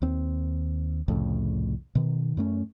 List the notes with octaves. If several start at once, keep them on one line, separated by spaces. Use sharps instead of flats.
D#2 C4
C2 F2 A2 C#3
B2 D#3
F#2 A3 C#4